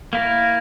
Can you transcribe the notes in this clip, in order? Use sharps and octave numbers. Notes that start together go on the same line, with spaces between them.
A#3 E4 A#4